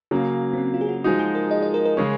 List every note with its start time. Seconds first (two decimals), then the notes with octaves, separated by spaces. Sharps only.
0.11 C#3 F#3 A#3 C#4
0.53 C4
0.58 C#4
0.74 F4
0.81 G#4
0.89 F#4
1.04 F3 G#3 D#4 F#4
1.19 G#4
1.35 A#4
1.51 D#5
1.62 D#5
1.74 A#4
1.85 A#4
1.97 C#3 G#3 C#4